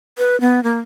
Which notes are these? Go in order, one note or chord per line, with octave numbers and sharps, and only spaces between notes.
B4
B3
A#3